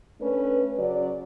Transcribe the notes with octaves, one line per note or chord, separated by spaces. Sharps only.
A3 C#4 D4 B4
C#3 F#3 F#4 D5